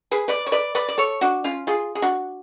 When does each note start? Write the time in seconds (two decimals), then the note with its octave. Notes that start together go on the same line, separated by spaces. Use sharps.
0.11 G#4 B4
0.28 B4 D5
0.46 C#5
0.52 B4 D5
0.75 B4 D5
0.88 D5
0.98 A4 C#5
1.21 D4 F#4
1.44 C#4 F4
1.67 F4 G#4
1.95 G#4
2.02 D4 F#4